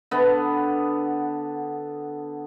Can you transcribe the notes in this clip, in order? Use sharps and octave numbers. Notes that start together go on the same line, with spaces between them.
D3 B3